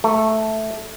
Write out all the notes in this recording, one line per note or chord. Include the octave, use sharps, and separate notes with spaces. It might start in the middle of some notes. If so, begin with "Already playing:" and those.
A3